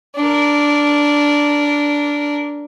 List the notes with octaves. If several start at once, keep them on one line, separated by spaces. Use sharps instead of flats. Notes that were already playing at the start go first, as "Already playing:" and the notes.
D4 A#4